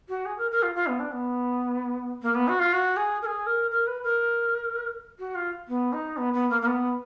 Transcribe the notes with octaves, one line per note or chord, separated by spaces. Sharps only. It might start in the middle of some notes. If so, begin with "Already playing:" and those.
F#4
G#4
A#4
A#4
F4
F4
B3
D4
B3
A#3
B3
F#4
F4
F#4
G#4
A#4
G#4
A#4
A#4
B4
A#4
F#4
F4
B3
D#4
B3
B3
A#3
A#3
B3